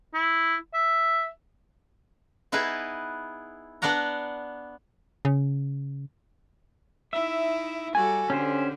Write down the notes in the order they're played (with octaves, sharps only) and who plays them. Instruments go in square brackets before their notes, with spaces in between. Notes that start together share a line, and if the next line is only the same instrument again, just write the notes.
[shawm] E4
E5
[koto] B3 D#4 E4 G#4 B4
B3 D4 D5 F#5 A#5
[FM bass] C#3
[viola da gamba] D#4 E4 [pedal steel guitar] E5
[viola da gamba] G3 F#4 A4 [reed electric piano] G#5
[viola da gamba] D3 [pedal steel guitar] C#4 G4 C5